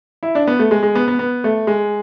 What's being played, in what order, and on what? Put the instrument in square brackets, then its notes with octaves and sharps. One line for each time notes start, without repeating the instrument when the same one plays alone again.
[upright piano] E4
D4
B3
A3
G#3
G#3
B3
B3
B3
A3
G#3